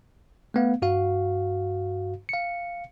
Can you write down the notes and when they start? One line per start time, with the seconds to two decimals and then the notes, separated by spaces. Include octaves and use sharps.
0.54 A3 B3 F5
0.82 G2 F#4 F5
2.29 F5 C#7